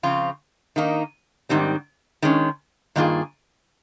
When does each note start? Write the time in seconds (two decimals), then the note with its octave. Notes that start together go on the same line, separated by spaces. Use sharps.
0.03 C#3 F3 C4 F4
0.76 D#3 A#3 D#4
1.49 G#2 D#3 G3 C4
2.22 D#3 G#3 C#4
2.96 G2 D#3 A#3 F4 G#4